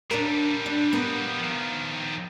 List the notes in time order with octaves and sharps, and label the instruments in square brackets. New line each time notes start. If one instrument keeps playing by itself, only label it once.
[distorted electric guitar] A#2 G3 [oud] D4 A#4
[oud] D4
B3 A#4
[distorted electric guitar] D#3 F3